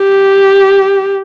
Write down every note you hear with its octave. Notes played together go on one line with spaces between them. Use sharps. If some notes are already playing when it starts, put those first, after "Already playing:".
Already playing: G4